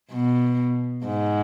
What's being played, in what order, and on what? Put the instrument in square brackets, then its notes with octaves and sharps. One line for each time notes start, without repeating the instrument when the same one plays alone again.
[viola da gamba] B2
G#2